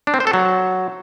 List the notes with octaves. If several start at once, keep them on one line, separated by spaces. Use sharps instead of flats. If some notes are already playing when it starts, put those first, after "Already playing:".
D4
C4
C5
A4
F#3